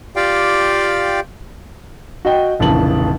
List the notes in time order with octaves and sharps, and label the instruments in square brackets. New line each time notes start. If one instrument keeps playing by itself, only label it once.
[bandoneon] F4 G4 D5 F5 G5
[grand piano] F#4 D#5 G5
F1 A#1 C#3 E3 A5 F#7